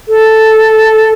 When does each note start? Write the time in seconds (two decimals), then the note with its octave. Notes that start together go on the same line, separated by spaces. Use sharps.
0.08 A4